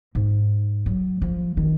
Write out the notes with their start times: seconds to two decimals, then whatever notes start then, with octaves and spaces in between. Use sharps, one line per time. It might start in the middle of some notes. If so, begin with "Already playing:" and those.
0.15 G#2
0.86 F#3
1.22 F3
1.57 D#3